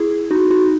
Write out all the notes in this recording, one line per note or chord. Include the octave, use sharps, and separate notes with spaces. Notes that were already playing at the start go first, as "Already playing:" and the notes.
Already playing: E4 G#4
D#4 F#4
D#4 F#4